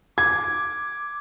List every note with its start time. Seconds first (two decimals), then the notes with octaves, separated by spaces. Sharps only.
0.18 D6 G#6